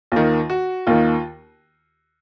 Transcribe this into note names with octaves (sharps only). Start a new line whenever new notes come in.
D#2 D#3 F4
F#4
D#2 D#3 F4